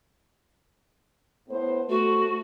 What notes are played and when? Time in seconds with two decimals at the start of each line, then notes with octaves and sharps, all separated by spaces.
1.49 A2 B3 C5
1.89 A3 F#4